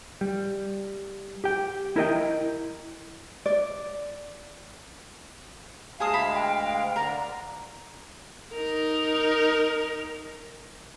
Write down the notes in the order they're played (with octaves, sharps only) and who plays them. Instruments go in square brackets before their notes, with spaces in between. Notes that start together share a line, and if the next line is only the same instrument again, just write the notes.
[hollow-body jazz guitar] G3
G4 G5
E4 A#4 D#5 G5
[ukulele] D5
[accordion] D2 G#3 F5 [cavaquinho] G#4 C5 D#6 [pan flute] A5
[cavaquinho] B5
[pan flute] G5
[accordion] D3 A#5 [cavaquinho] A#4 D5
[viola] D#4 A#4